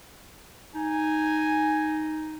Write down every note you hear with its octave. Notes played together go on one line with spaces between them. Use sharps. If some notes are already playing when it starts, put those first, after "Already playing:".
D#4 G#5